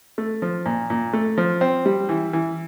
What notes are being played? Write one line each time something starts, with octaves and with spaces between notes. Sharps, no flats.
A3
F3
A#2
A#2
A3
F3
C4
G3
E3
E3